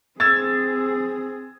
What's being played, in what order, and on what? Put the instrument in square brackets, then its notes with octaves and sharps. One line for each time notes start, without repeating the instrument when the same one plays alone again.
[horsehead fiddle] C4 G#4 [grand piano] E6 G#6 A6